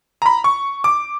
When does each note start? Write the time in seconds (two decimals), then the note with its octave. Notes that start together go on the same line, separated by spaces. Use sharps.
0.22 A#5 B5
0.44 C#6
0.84 D6